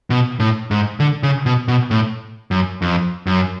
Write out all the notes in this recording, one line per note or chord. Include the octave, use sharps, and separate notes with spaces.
B2
A2
G#2
D3
C#3
B2
B2
A2
F#2
F2
F#2